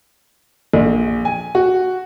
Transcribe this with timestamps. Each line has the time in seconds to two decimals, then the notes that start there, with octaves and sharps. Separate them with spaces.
0.74 A#1
1.25 G#5
1.55 F#4